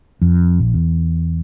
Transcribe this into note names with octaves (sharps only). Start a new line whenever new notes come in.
F2
A#1
E2